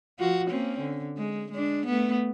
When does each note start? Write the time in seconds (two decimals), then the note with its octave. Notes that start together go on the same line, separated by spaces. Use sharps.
0.19 F3 F4 F#4
0.48 A#3 C4 C#4
0.80 D3
1.18 G#3
1.51 G#3 D4
1.86 A3 B3